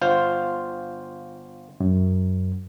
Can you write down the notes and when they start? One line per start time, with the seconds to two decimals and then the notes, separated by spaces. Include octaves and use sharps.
0.01 G1 F4 C5
1.80 F#2